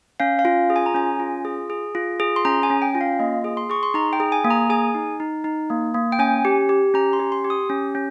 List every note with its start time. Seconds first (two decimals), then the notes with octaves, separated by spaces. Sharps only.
0.20 C#4 F5
0.39 F5
0.45 F4
0.70 G#4
0.76 G#5
0.86 A#5
0.94 C#4 G#5
1.20 F4
1.45 G#4
1.70 G#4
1.95 F4
2.20 G#4
2.36 C6
2.45 C#4 A#5
2.63 G#5
2.70 C#4
2.82 G5
2.95 F4
3.01 F5
3.19 A#3 D#5
3.44 G#4
3.57 C6
3.69 G#4 C#6
3.83 C6
3.94 D#4 A#5
4.13 G5
4.20 G#4
4.32 G#5
4.45 A#3
4.50 A#5
4.70 G#4 G#5
4.95 D#4
5.20 D#4
5.44 D#4
5.70 A#3
5.94 A#3
6.12 G5
6.19 C#4 G#5
6.45 G4
6.69 G4
6.94 C#4 A#5
7.13 C6
7.19 G4
7.32 C6
7.44 G4
7.50 D#6
7.69 C#4
7.95 C#4